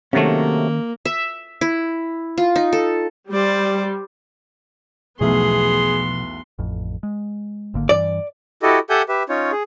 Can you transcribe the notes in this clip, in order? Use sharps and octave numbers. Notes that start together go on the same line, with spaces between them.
C3 D#3 F#3 A3 A#3 C#4
E5
E4
F4
D#4
A4
G3 C5 D5
B1 E2 B2 F3 A3 B3 G#4 C6
A1 F2
G#3
G#1 D3 A#3
G2 E3 D5
E4 F#4 G4 A4 D#5
G4 A4 E5 F#5 G#5 G6
G4 B4 E5
C#4 D#4 F4 C#5
G#4